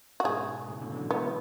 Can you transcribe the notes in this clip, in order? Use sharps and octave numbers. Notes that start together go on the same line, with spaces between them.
F#4
G#2 B2 G#4
A2 C#3
B2 D3
E3
D3 F#3
E3 G#3 B3